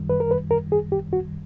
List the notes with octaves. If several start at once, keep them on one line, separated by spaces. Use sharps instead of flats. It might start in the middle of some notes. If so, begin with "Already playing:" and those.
Already playing: F#2 D#3 G3
B4
A#4
B4
A#4
G#4
G4
F#4